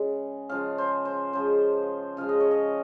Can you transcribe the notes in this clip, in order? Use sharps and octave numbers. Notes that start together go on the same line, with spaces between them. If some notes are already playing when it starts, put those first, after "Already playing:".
Already playing: C#3 G#3
C#3 F3 G#3 F5
C5
C5
C#3 F3 G#3 C5
C#3 F3 G#3 F5
D#5
C#5
D#5